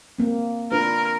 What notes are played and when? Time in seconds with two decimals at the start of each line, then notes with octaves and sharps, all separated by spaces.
0.18 A#3 C4
0.72 D4 F4 A#4 B4